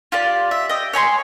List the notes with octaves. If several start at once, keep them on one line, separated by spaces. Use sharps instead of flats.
F4 G4 D5
E5
D#5 G5
C#5 G#5 B5 C6